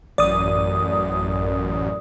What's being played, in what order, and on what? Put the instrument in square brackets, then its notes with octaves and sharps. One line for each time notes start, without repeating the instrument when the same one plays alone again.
[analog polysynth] A1 F#2 [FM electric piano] D5 D#6